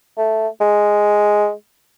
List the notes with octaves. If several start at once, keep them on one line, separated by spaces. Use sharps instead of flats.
A3
G#3